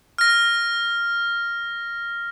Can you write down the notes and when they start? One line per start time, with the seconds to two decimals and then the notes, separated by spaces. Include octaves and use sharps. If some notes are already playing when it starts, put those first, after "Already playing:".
0.18 F6 A#6